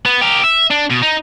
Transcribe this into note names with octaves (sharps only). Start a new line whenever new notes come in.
B3
G4 A#4
E5
D4
B2
D#4